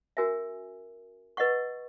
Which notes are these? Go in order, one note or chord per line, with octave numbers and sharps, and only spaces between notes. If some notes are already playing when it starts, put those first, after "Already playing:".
C#4 F#4 A#4 E5 G#5
B4 D#5 F#5 C#6